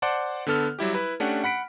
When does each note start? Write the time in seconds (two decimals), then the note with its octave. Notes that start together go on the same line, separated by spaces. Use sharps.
0.02 C5 D5 F#5 A5 C6 D6
0.47 D3 B3 A4 F6
0.79 F#3 G3 E4 G4
0.94 E4 B4
1.20 A3 C#4 D4 G4 F#5
1.44 F#5 B5 B6 D7